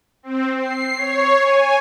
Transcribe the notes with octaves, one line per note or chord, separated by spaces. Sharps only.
C4
C7
C#5
G#5